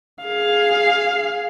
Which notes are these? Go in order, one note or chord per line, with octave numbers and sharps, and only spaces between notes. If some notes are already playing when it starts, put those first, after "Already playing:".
G#4 F5